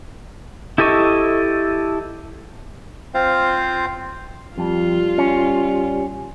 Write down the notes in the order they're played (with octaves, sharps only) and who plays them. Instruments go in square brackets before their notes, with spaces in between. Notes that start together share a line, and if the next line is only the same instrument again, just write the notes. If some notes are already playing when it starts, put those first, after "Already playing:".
[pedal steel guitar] E4 G4 A4 D#5 C#6
[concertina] C4 F4 C5 F5
[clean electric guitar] F2 [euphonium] G3 [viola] F4
[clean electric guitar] C#4